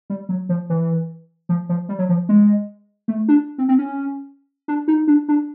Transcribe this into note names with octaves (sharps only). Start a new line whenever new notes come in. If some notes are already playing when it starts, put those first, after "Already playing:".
G3
F#3
F3
E3
F3
F3
G3
F#3
F3
G#3
A3
D4
C4
C4
C#4
D4
D#4
D4
D4